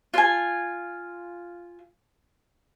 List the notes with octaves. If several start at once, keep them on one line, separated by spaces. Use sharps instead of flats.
F4 G#5